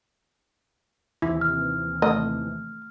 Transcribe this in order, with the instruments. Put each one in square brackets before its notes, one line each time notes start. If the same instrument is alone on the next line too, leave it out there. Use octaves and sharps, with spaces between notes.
[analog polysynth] D#2 C3 E3 [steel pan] E4
[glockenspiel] F6
[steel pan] A3 [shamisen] D#5